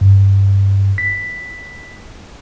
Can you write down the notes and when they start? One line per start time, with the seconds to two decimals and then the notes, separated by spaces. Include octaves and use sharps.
0.01 G2
0.98 B6